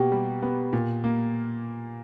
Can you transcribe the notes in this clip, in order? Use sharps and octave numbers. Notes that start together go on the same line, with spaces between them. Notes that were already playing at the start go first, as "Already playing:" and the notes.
Already playing: B2 A#3 G4 G5
G3
B3
A#2
A#3